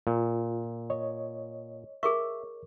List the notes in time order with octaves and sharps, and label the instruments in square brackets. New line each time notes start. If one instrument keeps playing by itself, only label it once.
[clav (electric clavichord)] A#2 [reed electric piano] F4
[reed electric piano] C#5 D#5
[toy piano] G#4 A#4 C#6 [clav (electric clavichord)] E5